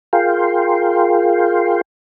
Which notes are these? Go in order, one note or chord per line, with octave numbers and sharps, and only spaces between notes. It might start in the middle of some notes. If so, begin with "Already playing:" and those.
F4 G#4 A#4 F5 G5 C6